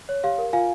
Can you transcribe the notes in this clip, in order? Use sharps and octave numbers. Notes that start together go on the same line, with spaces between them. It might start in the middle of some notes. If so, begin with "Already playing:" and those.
C#5
G4 F5
A#4
F4 F5 G#5